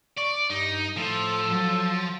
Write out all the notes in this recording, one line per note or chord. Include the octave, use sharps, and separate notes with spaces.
D5 C#6
G2 D#4
A2 F3 A4
F#3